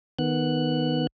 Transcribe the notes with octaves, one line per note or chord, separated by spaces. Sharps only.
D#3 B3 F#6